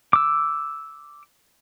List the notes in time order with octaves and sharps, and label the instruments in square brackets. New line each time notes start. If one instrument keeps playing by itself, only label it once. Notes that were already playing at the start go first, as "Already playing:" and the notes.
[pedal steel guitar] D6 E6